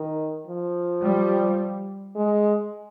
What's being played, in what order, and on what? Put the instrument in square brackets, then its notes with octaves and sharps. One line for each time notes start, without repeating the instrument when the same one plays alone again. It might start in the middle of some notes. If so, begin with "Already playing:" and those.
Already playing: [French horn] D#3
F3
[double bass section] G3
[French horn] G#3